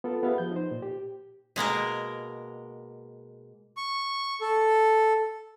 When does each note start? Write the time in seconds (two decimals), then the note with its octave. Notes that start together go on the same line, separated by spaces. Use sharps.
0.04 B3 F4 A4 A#4
0.23 B3 G4 G#4 E5 F5
0.38 F3 G6
0.52 D#4 C5
0.71 A#2
0.82 G4
1.56 B2 G#3 A#3 A#4
3.77 C#6
4.41 A4